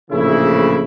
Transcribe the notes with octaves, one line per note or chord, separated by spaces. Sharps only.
A#1 A2 C#3 E3 A3 E4